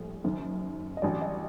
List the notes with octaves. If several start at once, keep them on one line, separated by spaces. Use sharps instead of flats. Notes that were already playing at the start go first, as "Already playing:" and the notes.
Already playing: A#1 A2 G3
F#1 F#2 D#3
D#5
A1 G2 F#3 D5
D#5